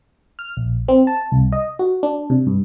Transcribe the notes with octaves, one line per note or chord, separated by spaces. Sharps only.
F6
A#1
C4
A5
C2
D#5
F#4
D4
C3
G2